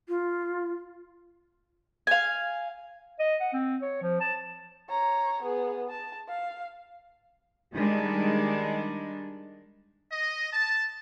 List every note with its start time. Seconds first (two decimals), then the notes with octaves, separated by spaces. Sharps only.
0.08 F4
2.07 F5 G#5
3.19 D#5
3.41 F#5
3.53 C4
3.82 C#5
4.02 F3
4.20 A5
4.90 C#5 A#5
5.43 B3 G#4
5.90 A5
6.28 F5
7.74 D#3 G3 G#3 D4
10.11 D#5
10.52 A5